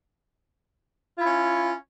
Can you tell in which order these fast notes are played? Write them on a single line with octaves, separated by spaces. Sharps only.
F4 E4 C#4